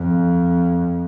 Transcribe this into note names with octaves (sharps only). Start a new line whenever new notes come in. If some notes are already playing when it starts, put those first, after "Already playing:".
Already playing: F2